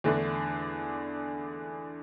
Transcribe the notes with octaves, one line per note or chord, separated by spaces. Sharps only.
E2 D3 A3 D4